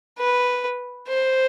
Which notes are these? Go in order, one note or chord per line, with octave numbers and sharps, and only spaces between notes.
B4
C5